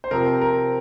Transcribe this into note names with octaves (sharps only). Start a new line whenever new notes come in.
C5
C3 F3 C4 A#4
A#4